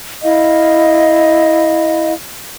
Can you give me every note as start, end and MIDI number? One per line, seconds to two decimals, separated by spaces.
0.23 2.12 64
0.23 2.12 75
0.23 2.12 77